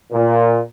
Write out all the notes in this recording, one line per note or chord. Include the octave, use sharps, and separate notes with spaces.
A#2